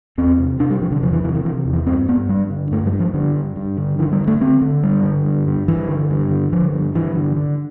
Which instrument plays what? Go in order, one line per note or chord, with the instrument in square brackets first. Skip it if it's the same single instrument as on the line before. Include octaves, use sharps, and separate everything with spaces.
[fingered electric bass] E2 C4
C3
C3 D4
G3
C3 F3
D3
E2 F3
E3
C3 E3
E3
C3 E3
E2
E3
G2 C4
G2 B3
G2 G3
D3
G2 A3
G3
G2
F3
G2 D3
G2
G2
D3
D3 E3
G3
G2
A3
D3 C4
D3
G2 G3
D3
G2
G2
G2 E3
D3
G2
D3
D3 F3
G2
G2 E3
D3
D3